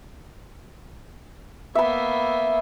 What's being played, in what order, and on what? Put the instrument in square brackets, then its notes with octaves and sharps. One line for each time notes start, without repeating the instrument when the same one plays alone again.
[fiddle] A#3 B3 [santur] E5 B5